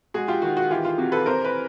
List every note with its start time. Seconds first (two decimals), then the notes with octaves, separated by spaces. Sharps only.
0.14 G#3 F#4 G#4
0.28 F4 G4
0.42 D#3 F#4
0.57 F#4
0.71 E3 F4 G4
0.85 F4
0.98 C3 F#4
1.12 A4 B4
1.26 C3 A#4 C5
1.45 B4